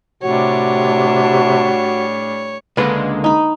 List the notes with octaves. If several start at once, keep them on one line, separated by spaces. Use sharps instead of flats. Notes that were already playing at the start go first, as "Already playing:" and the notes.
A2 C3 G3 D4 F#4 C#5
C#2 D3 G#3 A#3 B4
D#4 B5